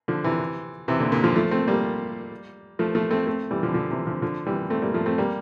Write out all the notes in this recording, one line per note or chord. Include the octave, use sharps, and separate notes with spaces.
D3 F3
C3 E3
C3 E3
A#2 D3
A#2 D3
D3 F3
F3 A3
A3 C4
G3 A#3
F3 A3
F3 A3
A3 C4
A3 C4
E3 G3
D3 F3
D3 F3
C3 E3
D3 F3
D3 F3
E3 G3
A3 C4
G3 A#3
F3 A3
A3 C4
G3 A#3